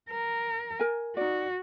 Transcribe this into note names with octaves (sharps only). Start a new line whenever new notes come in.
A#4
A#4 G#5
D#4 F#4 D5